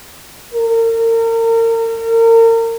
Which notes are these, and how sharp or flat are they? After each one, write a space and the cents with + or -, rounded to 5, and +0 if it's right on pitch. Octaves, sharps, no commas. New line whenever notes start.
A#4 -35